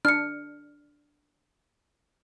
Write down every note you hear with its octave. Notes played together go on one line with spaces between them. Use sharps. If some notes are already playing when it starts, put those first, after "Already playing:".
D4 F6 C#7